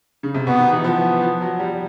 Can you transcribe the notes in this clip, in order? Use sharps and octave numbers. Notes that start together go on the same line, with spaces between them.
C#3
C3
B2 B3
D#3
E3
F3 B3
F3
F#3
G3